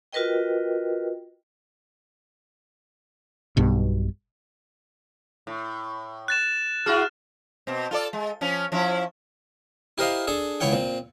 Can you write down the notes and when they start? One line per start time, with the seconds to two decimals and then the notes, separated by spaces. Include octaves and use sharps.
0.13 F4 F#4 A#4 B4 D#5 G5
3.57 B1 G2 B2
5.47 A2
6.28 F#6 A6 E7
6.86 E4 F#4 G#4 F6
7.67 B2 C4
7.91 F4 A4 D5
8.13 G#3
8.41 F3 C#4
8.72 F3 C#4 E4
9.98 E4 G4 A#4 C5 D#5 F5
10.27 D4 G#4 A4
10.60 C#2 C#3 E4 C#5 F#5 G5
10.73 A#2 C4